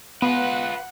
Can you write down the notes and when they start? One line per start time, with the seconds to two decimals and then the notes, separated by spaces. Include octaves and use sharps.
0.22 B3 F4 B4 F#5